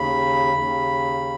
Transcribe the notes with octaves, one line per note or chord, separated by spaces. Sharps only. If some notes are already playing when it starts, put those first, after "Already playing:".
Already playing: D#2 C#3 B5
D#2 C#3